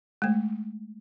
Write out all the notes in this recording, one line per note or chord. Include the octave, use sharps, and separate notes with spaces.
G#3 A3